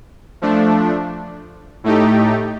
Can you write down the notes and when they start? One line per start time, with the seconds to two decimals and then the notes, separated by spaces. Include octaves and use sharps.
0.42 F3 A3 D4
1.84 A2 A3 D#4 G4